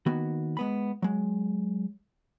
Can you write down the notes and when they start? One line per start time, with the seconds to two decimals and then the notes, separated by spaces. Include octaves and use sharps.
0.06 D#3 A#3 B3 F#4
0.57 G#3 B3 B5
1.02 F#3 G#3